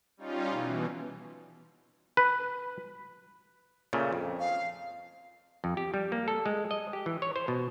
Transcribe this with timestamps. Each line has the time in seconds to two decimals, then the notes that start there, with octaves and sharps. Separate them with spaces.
0.17 G3 C#4 D#4 F4
0.50 B2 E3
2.17 B4
3.93 A#2 C#3 A3
4.12 F2
4.40 F5
5.64 F2
5.77 G4
5.94 G3
6.12 A#3
6.28 A4
6.46 G#3
6.71 D#5
6.93 G4
7.06 E3
7.22 C#5
7.36 C5
7.48 B2